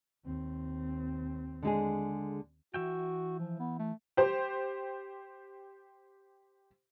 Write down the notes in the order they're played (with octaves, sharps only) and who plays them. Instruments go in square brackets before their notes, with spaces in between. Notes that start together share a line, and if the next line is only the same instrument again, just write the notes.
[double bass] D#2 C4
[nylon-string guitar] D3 G#3 G#4
[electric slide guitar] E3 E5 G5 [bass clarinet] F#4
[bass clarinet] F3
B3
A3
[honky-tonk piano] G4 C5